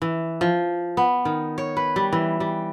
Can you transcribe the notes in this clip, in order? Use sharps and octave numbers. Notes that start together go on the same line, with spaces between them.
E3
F3
B3
D#3
C#5
B4
G3
E3
G3